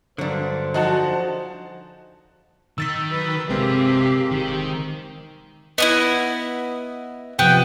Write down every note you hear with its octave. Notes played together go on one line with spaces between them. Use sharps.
G2 D3 F#3 D4 C5
F3 D#4 F#4 G#4 F#5 A5
D#3 E6 A6 B6
F#3 B4
G1 C3 G#3 C4 G4 A#4 F5
D#1 D#3
B3 D4 E4 D#5
C3 F3 B3 G5